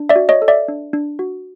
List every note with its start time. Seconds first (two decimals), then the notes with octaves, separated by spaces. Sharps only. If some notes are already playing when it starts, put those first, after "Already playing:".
Already playing: D4
0.09 D5 E5
0.16 F#4
0.29 C#5 D#5
0.42 A4
0.48 D5 E5
0.68 D4
0.93 D4
1.19 F#4